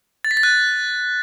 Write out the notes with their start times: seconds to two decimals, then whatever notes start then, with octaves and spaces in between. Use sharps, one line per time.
0.25 A6
0.31 B6
0.37 A6
0.43 F#6